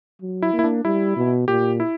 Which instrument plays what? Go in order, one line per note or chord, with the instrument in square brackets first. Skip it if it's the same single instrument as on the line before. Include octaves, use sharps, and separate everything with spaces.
[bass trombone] F#3
[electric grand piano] E4
[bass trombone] A#3
[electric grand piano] E4
D4
[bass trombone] G3 [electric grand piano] E4
[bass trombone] B2
[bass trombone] A#2 [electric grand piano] G4
[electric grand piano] E4